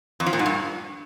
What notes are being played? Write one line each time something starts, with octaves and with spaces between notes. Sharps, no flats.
F2
F3
A#2
G#2
G2